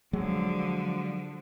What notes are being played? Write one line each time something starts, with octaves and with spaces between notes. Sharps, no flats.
D3 F3 F#3 G#3